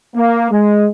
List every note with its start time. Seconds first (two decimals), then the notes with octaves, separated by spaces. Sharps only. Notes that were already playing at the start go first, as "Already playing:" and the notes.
0.16 A#3
0.51 G#3